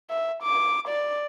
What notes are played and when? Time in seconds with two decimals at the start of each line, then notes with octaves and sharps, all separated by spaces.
0.10 E5
0.43 D6
0.88 D5